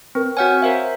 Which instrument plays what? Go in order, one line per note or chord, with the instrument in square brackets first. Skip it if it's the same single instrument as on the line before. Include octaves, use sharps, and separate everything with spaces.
[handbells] C4 [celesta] A#4 B4
[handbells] F#4 F#5 G#5 [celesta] C#5 F6 G6
[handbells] A#4 C5 E5 [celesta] F5